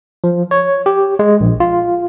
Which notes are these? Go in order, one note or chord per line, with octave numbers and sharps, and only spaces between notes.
F3
C#5
G4
G#3
A#1
F4